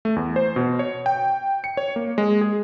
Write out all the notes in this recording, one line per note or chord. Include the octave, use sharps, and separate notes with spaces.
A3
E2
C5
B2
C#5
G5
C#7
C#5
A#3
G#3
G#4